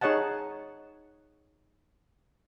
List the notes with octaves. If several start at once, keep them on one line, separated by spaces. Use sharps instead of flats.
D#4 G#4 C#5 D#5 F#5 A5